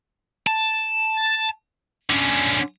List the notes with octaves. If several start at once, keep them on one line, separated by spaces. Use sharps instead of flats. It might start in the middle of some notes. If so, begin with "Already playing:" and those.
A5
D3 C#4